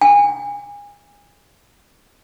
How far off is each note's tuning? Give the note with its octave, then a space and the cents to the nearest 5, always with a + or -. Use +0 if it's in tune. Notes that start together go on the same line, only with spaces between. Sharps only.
G#5 -30